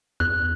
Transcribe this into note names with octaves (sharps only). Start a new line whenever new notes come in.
E2 F#6